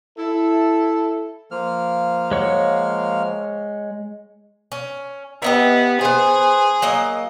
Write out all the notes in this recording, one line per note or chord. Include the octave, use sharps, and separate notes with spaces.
E4 A4
F3 A#3 F6
G#3 C#5 F#5
C#4
B3 G4 D#5 E5
B3 G#4 C5
F#3 A#3 D#5